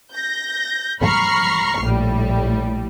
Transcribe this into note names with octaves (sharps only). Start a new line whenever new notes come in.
G6 A#6
A#5 B5 C#6 F6 C7
A#1 A2 G3